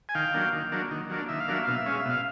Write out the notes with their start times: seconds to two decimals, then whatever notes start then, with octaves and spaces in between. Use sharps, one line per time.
0.09 G#5
0.15 D#3 F5 G5
0.34 F#3 A#3 D4
0.53 D#3
0.72 F#3 A#3 D4
0.91 D#3
1.09 F#3 A#3 D4
1.28 D#3 E5
1.40 F5
1.48 F#3 A#3 D4 E5
1.64 B2 F5
1.75 E5
1.86 G#3 C#4 F5
1.99 E5
2.05 B2 F5